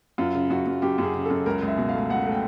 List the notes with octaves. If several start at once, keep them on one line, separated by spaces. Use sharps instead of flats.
F#2 F4
C#3
F#2 F#4
F#2
F#2 G4
F#2 G#4
C#3
A4
F#2
C#2 A#4
C#2
E5
B2
F5
A3
C#2 F#5
A3
G5